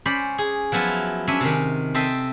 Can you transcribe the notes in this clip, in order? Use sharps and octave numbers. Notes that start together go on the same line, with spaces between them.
C#4 C5 D5 B5
G#4
F3 F#3 B3 E4 F4
C#4 D4 E5 G#5
C3 D#3
C4 A4 C5 D#5 E5